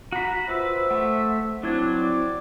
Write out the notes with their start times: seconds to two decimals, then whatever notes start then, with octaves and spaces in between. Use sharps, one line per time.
0.12 F#4 A#5 B5
0.49 F4 B4 C5 E5 E6
0.91 A3 F#5
1.63 F#3 C4 D4 E4 G#6
1.97 D5